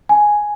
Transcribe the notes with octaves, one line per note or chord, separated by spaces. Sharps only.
G#5